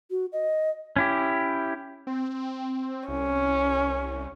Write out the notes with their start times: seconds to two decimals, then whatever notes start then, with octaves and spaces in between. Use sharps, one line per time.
0.11 F#4
0.33 D#5
0.96 C#4 E4 G4
2.07 C4
3.08 C2 C#4